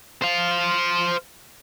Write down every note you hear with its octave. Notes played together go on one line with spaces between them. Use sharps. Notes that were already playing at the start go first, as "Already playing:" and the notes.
C5 F5